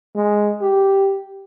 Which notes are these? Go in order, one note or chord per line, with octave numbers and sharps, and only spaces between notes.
G#3
G4